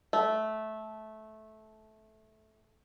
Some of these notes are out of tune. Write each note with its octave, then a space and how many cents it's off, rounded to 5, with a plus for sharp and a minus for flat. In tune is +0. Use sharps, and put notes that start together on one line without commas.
A3 -15